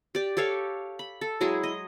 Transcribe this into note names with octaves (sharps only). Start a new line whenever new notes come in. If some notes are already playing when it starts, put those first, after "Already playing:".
G4 D5
G4 A4 C#5 F5
B5
A4
F#3 G#3 E4 G#4
D#5